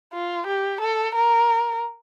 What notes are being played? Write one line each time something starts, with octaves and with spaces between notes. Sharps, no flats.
F4
G4
A4
A#4